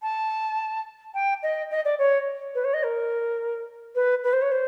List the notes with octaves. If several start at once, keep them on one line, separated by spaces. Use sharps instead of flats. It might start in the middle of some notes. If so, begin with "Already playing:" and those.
A5
G5
D#5
D#5
D5
C#5
B4
C#5
D#5
A#4
B4
B4
C5
C#5
C5